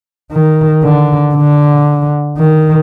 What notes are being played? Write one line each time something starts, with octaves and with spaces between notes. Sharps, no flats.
D#3
D3
D3
D#3